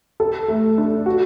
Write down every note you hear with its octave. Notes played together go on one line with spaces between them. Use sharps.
A4
A3
D4
F#4